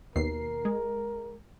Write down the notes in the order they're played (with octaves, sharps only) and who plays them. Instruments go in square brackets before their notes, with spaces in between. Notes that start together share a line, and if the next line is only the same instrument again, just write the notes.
[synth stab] D#2 B2 C7 [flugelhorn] A#4
[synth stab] G#3